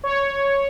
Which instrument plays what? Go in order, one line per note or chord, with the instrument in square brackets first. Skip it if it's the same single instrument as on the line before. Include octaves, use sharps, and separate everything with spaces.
[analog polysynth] C#5